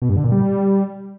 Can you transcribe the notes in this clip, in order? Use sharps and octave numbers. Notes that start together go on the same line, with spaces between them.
B2
G2
D3
A#2
G3